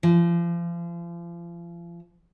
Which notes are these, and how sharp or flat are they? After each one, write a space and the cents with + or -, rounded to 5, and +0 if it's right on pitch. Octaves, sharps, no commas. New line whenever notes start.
F3 -35